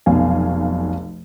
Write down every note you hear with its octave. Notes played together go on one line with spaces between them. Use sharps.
F1 B1 B2 F5 G#5